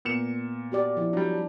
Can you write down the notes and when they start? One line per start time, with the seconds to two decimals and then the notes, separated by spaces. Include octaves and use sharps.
0.05 A#2 B3 C#7 E7
0.72 F#4 G4 D5
0.97 F3 E4
1.13 F#3 G3 D4